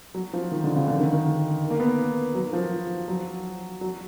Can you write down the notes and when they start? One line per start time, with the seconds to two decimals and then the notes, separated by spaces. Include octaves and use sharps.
0.14 F#3
0.33 F3
0.51 D#3
0.64 D3
0.76 C#3
0.88 D3
1.00 D#3
1.13 D#3
1.70 A#3
1.80 B3
2.35 F#3
2.53 F3
3.08 F#3
3.81 F#3